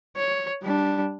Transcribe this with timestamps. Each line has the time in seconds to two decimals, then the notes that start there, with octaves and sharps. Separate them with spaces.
0.16 C#5
0.63 G3 D4